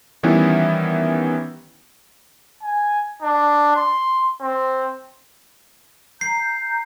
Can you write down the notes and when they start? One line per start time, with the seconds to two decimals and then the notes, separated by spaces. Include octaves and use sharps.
0.23 D#3 E3 G3 B3 C#4 E4
2.63 G#5
3.23 D4
3.76 C6
4.41 C4
6.21 A#5 G6 C7